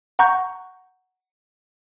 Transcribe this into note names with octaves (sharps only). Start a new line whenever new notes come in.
F#5 A#5 C#6 G6